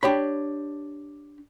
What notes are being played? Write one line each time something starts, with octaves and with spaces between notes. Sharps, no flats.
D4 G4 C#5 B5